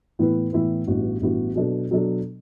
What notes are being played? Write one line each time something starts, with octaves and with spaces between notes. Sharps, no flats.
A2 E3 B3 E4 B4
A2 E3 B3 E4 B4
A1 G2 E3 B3 F#4
A1 G2 E3 B3 F#4
B2 F#3 B3 D4 A4
B2 F#3 B3 D4 A4